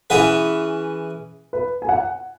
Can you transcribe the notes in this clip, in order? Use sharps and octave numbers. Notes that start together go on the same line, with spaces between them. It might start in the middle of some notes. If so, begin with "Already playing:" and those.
E3 C#4 G#4 B4 F#5
B4
G#5
F#5